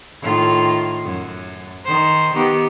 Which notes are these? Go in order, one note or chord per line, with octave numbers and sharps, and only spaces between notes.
A2 D#3 F4
F#2
D#3 C5
D#3 B3 G4